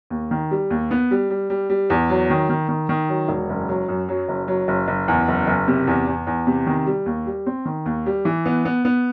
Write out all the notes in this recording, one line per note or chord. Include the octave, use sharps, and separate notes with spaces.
D#2
D#3
G3
D#2
B3
G3
G3
G3
G3
E2
F#3
D#3
D#3
D#3
D#3
F#3
E1
F#1
F#3
F#2
F#3
F#1
F#3
F#1
F#1
E2
F#1
F#1
C3
E2
E2
E2
C3
D#3
G3
D#2
G3
C4
D#3
D#2
G3
E3
B3
B3
B3